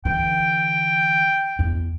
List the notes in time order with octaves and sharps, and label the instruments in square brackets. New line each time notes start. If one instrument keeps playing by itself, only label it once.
[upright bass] D3 E3 [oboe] G5
[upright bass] E2 E4